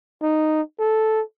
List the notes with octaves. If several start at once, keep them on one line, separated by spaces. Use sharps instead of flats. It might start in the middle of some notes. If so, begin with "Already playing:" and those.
D#4
A4